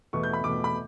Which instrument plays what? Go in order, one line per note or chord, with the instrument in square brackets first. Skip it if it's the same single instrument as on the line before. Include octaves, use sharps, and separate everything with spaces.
[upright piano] E2 B2 A3 C#6
G6
B5
E2 B2 A3 D6
B5